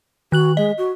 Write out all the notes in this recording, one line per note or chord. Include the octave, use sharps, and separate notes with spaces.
D#3 F#4 F#6 F#7
G#3 D#5
F#4